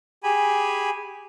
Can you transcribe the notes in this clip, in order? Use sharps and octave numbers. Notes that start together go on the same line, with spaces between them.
G4 G#4 G#5 B5